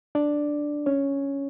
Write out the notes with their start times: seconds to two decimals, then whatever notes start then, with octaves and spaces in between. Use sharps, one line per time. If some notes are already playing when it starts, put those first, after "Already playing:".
0.15 D4 D5
0.86 C#4 C#5